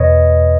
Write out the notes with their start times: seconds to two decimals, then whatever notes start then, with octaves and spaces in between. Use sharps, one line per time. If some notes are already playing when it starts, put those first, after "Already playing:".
Already playing: E2 B2 B4 C#5 D#5